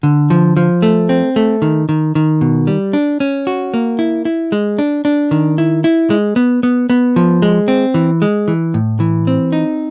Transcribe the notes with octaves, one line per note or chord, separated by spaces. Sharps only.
D3
F3
F3
A3
C4
A3
D#3
D#3
D#3
B2
G3
D4
C#4
F#4
A#3
E4
E4
G#3
D4
D4
D#3
E4
E4
G#3
B3
B3
B3
F3
G#3
C4
E3
G#3
E3
A2
E3
C4
D#4